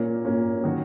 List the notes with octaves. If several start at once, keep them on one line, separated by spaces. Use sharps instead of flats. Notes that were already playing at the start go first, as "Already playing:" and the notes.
Already playing: A#2 A#3 C#4
A#2 A#3 C#4
D#3 F#3 C#4 F#4